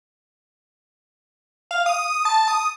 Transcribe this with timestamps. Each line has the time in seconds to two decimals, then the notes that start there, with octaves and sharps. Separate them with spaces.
1.71 F5
1.86 D#6
2.04 D#6
2.25 A5
2.48 D#6